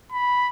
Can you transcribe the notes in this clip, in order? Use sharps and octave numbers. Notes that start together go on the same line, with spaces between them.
B5